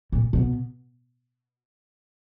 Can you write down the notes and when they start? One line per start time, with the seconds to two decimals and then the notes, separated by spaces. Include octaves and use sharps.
0.12 A#2
0.33 B2